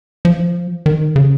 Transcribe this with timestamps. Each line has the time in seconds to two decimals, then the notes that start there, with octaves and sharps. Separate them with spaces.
0.25 F3
0.86 D#3
1.16 C#3